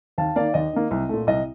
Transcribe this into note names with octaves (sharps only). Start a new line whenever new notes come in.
D#2 F5 A5
D#3 A#3 D5 F5
D#2 D#5
D#3 A#3
C2
A#2 A3
C2 D#5